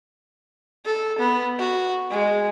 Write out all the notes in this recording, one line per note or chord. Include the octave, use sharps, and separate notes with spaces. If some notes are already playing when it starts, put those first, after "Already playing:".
A4
B3
F#4
G#3